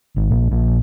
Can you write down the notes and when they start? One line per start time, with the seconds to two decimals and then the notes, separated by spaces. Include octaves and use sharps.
0.16 G#1
0.31 A#1
0.51 A#1